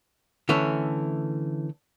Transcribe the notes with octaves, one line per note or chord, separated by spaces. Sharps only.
D3 E3 A3 C#4